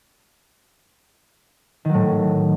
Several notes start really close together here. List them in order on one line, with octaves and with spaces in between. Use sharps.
D#3 F#3 A2